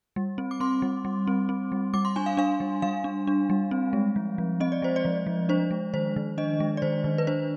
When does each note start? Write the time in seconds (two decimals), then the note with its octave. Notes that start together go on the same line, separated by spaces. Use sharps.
0.16 G3
0.38 C4
0.51 D6
0.60 C4 C6
0.82 G3
1.05 G3
1.27 C4
1.49 C4
1.72 G3
1.94 G3 D6
2.05 C6
2.16 D4 G#5
2.26 F5
2.37 D4 F5
2.60 G3
2.82 G3 F5
3.04 D4
3.27 D4
3.50 G3
3.71 C4
3.93 G#3
4.16 F3
4.38 F3
4.60 C4 D#5
4.72 D5
4.82 G#3 C5
4.96 D5
5.05 F3
5.26 F3
5.49 D4 C5
5.71 G#3
5.94 D#3 C5
6.16 D#3
6.38 D4 D#5
6.60 G#3
6.77 D5
6.82 D#3 C5
7.04 D#3
7.18 B4
7.27 D4 C5